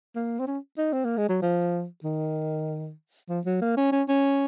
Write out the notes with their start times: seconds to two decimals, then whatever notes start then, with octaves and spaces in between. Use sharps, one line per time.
0.16 A#3
0.39 C4
0.47 C#4
0.78 D#4
0.93 C4
1.05 A#3
1.17 G#3
1.29 F#3
1.42 F3
2.04 D#3
3.29 F3
3.46 F#3
3.61 A#3
3.77 C#4
3.92 C#4
4.09 C#4